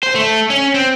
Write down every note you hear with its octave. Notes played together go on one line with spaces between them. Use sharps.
C5
A3
C#4
C4